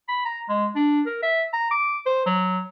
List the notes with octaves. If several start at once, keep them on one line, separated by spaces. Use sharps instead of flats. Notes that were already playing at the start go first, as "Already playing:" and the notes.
B5
A#5
G#3
D4
A#4
E5
A#5
D6
C5
F#3